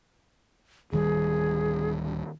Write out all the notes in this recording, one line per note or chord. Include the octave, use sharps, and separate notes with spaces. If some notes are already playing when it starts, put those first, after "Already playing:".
D1 D#3 G3 G#4